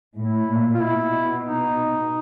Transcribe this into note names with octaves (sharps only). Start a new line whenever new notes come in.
A2 E4
A#2
F4
B2 E4
D#4